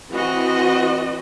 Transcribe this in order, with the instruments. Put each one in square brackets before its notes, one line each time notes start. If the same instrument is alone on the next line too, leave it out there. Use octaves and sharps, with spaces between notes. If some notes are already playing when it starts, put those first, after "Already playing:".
[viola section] E3 C4 F#4 D#5